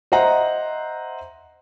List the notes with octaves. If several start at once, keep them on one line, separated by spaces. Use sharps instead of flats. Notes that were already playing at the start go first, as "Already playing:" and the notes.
C5 D#5 E5 F#5 A#5